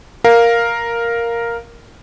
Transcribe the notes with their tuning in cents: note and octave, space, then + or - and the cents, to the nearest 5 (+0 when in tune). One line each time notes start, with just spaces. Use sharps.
A#4 +0 F5 +0